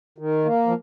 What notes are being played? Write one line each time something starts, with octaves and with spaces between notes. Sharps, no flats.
D#3
A#3
F3